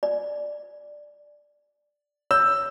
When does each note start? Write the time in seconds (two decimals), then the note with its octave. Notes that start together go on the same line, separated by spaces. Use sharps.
0.03 D5
2.31 C#5 E6